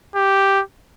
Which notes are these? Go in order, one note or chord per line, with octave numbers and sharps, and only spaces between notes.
G4